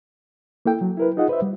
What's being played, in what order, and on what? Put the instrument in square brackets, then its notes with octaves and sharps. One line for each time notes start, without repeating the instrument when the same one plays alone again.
[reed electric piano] A#3 E4 A4 G5
F#3
E4 A#4 B4
D#4 F4 G#4 D#5 F#5
B4 C5 E5
G3